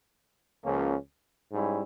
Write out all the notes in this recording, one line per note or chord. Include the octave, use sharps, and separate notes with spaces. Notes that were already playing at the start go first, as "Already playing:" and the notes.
C#2 C#3 F3 A#3 C#4
G#2 G3 C#4 E4